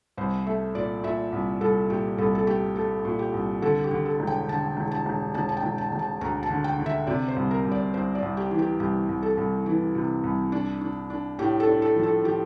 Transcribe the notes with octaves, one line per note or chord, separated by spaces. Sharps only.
C2 C5
A3 E5
A#2 D5
A#2 E5
C2
C2 A4
A#2 G4
C2 A4
A4
A3 G4
A3 A4
A#2
G4
C2
D3 A4
G4
D3
A4
E1
G5
D3 A5
E1
A5
E1
E1 A5
A5
G5
E1
A5
E1
A5
D2 A#5
A5
D3
G5
D3
E5
C3 D5
C5
C2
A#4
C2
D5
C2 C5
D5
C2
G4
E3
G4
C2 G4
C2
A4
C2
E3
C3
C2
D4
D4
D4
A2 G4
A4
D4
A4
F3
A4
F3 G4